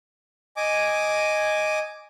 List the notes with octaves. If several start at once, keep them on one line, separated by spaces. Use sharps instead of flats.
D#5 G#5 D6